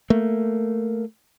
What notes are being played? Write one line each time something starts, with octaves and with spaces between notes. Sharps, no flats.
A3 A#3